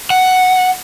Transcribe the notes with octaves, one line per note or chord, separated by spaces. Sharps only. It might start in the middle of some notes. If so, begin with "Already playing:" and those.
F#5